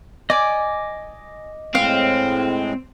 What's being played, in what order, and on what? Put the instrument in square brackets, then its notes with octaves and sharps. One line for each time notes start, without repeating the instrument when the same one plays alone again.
[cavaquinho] D5 G#5 [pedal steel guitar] D#5 D6
[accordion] A2 G#3 [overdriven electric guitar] C4 [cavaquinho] F5